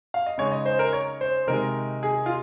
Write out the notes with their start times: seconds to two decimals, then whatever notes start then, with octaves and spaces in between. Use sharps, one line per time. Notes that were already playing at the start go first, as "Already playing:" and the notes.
0.14 F5
0.26 D#5
0.38 C#3 G#3 D#4 C#5
0.52 D#5
0.66 C5
0.79 A#4
0.93 C#5
1.21 C5
1.47 C3 D#3 G#3 D#4 A#4
2.03 G#4
2.26 F4